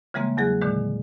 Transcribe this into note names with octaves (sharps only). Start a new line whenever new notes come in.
C#3 E3 G3 G#3 A#3 C4
E2 F#3 G#4 F#6
A#2 D3 D#3 G#3